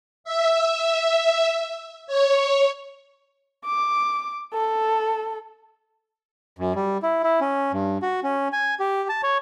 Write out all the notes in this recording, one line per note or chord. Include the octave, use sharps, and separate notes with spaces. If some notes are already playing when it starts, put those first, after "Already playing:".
E5
C#5
D6
A4
F#2
G3
E4
E4
C#4
G2
F#4
C#4
G#5
G4
A5
C#5